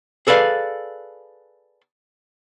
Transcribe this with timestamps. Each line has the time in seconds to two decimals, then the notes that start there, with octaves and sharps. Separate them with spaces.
0.27 G#4 A4 B4 D5 F5